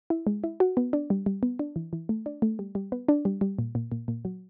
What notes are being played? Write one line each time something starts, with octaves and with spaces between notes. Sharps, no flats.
E4
G#3
E4
F#4
B3
D4
G3
G3
B3
D4
E3
E3
A3
D4
A3
G3
G3
B3
D4
G3
G3
A#2
A#2
A#2
A#2
F#3